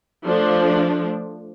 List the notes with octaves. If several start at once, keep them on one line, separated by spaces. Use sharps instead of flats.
F3 A3 D4